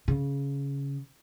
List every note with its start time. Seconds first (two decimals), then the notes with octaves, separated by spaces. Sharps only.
0.08 C#3